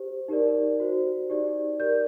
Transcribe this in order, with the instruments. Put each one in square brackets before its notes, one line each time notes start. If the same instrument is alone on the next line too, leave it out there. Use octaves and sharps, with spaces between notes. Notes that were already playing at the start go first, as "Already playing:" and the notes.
Already playing: [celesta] G4 C5
D#4 G4 A#4 D5
F#4 C5
D#4 G4 D5
G4 A#4 D5 G6